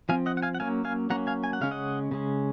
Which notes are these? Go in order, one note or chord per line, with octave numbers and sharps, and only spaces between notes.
F3 C4 F5 G#5
D#5 F#5
F#5
F5 G#5
F#5
F#3 A#3 C#4 F5 G#5
F5 G#5
F#3 A#3 C#4 F#5 A#5
F5 G#5
G#5
F#5
C#3 G#3 C#4 F5
D#5 F#5
C#3 G#3 C#4